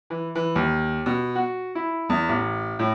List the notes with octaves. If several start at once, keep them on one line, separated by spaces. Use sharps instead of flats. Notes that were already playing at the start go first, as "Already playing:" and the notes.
E3
E3
D#2
B2
F#4
E4
E2
A1
A2